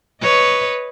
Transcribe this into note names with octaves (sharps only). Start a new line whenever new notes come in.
B4 C#5 D#5